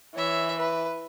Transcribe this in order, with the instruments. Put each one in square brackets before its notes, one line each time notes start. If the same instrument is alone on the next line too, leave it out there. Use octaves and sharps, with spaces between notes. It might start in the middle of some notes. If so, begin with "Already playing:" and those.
[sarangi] E3 [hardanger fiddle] C#5 E5
[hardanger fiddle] B4